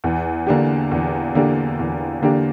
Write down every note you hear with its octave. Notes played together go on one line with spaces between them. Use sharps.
E2
D3 A#3 D4 G4
E2
D3 A#3 D4 G4
E2
D3 A#3 D4 G4